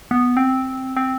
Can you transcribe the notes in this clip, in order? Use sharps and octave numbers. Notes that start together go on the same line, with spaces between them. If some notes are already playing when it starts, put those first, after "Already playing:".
B3
C4
C4